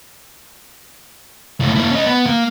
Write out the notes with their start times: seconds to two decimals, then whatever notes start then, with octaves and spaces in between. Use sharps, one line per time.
1.60 C#2 A2
1.76 A#3 E4
1.91 C#4 D#5
2.06 B3
2.26 A#3